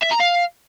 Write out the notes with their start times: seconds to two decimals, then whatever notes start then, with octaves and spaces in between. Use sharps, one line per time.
0.03 E5
0.12 A#5
0.20 F5